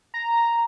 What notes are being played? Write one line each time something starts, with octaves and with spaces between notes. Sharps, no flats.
A#5